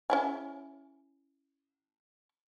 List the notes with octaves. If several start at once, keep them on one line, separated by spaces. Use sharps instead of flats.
C#4 E4 G#4